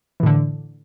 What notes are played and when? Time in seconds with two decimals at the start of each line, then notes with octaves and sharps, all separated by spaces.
0.20 E3
0.23 A2
0.26 D3